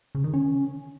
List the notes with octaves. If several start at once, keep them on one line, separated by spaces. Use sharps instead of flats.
C#3
D#3
C#4